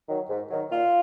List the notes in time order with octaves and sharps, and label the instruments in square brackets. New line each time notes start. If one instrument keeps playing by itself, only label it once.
[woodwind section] D#3 F#3
G#2
D#3 F#3
A#2 F4